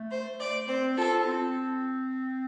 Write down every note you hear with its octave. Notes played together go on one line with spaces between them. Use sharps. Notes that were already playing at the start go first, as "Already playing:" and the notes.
Already playing: A3
C5
D5
C4 C5
F4 A4
C4